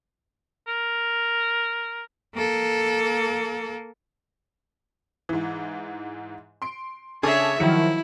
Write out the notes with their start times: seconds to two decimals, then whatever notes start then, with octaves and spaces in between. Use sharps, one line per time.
0.68 A#4
2.35 A#3 A4
5.29 G#2 E3
6.62 C6 D7
7.23 C#3 D4 G#4 A4 C#5 E5
7.60 D#3 F3 F#3 E4 C#7